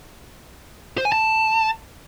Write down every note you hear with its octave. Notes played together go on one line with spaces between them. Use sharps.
C5
G#5
A5